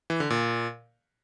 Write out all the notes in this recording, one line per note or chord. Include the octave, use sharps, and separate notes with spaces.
E3
D3
A#2